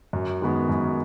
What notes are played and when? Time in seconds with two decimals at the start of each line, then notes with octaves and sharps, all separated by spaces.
0.13 F#2
0.41 D#3 G#3 B3 F#4
0.69 F#2